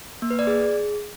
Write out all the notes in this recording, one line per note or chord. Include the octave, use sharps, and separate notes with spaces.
A#3
B4
D5
G#4